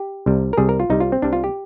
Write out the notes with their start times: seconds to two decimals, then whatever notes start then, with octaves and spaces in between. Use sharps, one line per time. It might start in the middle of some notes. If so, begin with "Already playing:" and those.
Already playing: G4
0.26 C2 C3 G3
0.53 A#4
0.57 C2 C3 G3 G#4
0.69 A#4
0.80 F4
0.90 C2 C3 G3 D#4
1.00 F4
1.12 C4
1.22 C2 C3 G3 D4
1.33 F4
1.44 G4